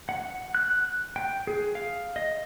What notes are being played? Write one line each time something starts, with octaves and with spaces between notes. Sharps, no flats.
F#5
F#6
G5
G#4
F5
D#5